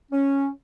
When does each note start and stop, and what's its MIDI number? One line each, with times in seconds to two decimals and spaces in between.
0.12 0.49 61